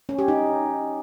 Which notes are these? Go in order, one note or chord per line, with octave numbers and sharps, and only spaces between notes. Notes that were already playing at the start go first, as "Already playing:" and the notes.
C#4
G4
D#4